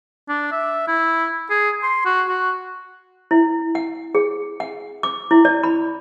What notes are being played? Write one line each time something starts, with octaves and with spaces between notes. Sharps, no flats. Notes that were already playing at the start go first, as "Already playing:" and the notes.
D4
E5
E4
G#4
C6
F#4
F#4
E4
F#5
G#4
F#5
D6
E4
D5
B5